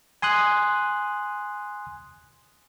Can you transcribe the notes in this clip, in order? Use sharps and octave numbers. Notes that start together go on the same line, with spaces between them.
G#5 C6 D#6 F#6